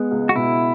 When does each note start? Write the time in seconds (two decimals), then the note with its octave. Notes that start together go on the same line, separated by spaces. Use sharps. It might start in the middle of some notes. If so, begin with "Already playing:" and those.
Already playing: G#3 B3
0.11 C#2
0.29 F#4
0.35 B2 E4